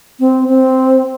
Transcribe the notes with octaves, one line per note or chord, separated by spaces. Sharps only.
C4
C4